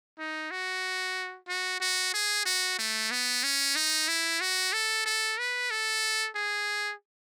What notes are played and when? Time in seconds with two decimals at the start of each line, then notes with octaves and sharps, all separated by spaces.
0.19 D#4
0.51 F#4
1.48 F#4
1.81 F#4
2.14 G#4
2.46 F#4
2.79 A3
3.11 B3
3.44 C#4
3.76 D#4
4.08 E4
4.41 F#4
4.73 A4
5.06 A4
5.38 B4
5.71 A4
6.35 G#4